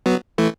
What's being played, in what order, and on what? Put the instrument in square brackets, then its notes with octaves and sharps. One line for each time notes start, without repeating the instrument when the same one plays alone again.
[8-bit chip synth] F#3 B3
E3 A3